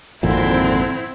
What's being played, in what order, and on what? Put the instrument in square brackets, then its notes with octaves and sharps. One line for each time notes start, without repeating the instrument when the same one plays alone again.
[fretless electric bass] G#1 F2 A#2 [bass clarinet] D3 [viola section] C4 E4